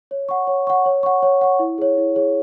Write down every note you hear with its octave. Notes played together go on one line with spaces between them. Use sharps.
C#5
F#5 C#6
C#5
F#5 C#6
C#5
F#5 C#6
C#5
F#5 C#6
E4
G#4 C#5
E4
G#4 C#5